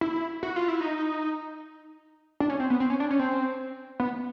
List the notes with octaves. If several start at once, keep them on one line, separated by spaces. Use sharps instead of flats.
E4
F#4
F4
E4
D#4
D4
C#4
C4
B3
C4
C#4
D4
C#4
C4
B3